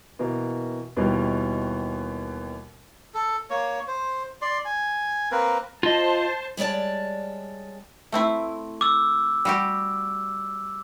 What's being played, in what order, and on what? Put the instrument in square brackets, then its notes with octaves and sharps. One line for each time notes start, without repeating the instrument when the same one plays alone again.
[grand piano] B2 E3 A#3
D#2 B2 D#3 E3 G3
[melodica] A4
A#3 C#5
C5
D5 C6
G#5
A#3 C4 A#4 B4
[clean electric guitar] F4 D#5 [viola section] C5 A5
[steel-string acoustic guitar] G3 G#3 C#5 D5 A5
[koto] A3 C4 E4
[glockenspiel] D6 E6
[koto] G3 F#4 G4